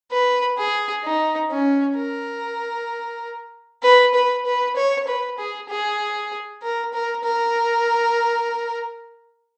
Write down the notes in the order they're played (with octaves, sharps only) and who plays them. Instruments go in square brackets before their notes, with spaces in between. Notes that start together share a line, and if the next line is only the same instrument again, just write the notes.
[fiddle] B4
G#4
D#4
C#4
A#4
B4
B4
B4
C#5
B4
G#4
G#4
A#4
A#4
A#4